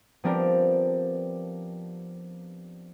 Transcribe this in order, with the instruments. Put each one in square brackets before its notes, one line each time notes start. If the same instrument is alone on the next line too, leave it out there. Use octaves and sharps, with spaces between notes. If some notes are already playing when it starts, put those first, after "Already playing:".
[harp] F3 B3 C4 D4 G4 A#4